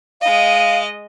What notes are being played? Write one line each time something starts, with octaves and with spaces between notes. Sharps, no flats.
G#3 D#5 F5